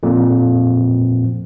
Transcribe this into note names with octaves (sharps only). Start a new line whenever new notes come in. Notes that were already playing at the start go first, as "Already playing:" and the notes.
F2 A#2